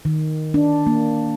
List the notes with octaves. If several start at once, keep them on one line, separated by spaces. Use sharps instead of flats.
D#3
D4
A#3